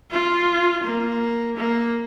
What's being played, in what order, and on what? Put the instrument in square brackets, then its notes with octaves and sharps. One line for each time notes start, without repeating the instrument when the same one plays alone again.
[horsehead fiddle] F4
A#3
A#3